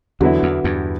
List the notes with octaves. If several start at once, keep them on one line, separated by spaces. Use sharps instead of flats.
E2 D3 F#3 B3 E4
E2
E2 G2